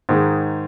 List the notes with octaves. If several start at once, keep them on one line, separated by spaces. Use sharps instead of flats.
G#2 D#3 G#3